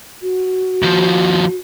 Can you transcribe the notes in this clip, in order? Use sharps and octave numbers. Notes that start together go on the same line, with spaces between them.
F#4
D#2 F3